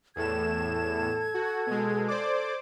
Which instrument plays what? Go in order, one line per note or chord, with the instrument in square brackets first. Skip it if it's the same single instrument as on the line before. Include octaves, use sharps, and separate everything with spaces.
[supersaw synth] E2 A2 E7 [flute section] A4 G#6
[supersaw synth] F#4
B2 G#3
C5 D5 D6